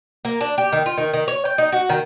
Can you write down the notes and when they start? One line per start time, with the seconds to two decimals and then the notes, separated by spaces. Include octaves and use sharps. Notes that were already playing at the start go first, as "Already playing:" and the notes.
0.25 A#3
0.41 D4
0.58 G4
0.73 D#3
0.86 F4
0.98 D#3
1.14 D#3
1.28 C#5
1.45 G5
1.58 D#4
1.72 F#4
1.89 D#3